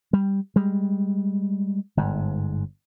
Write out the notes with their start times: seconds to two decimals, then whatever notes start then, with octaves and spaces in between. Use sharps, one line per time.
0.13 G3
0.56 G3 G#3
1.97 G1 G#2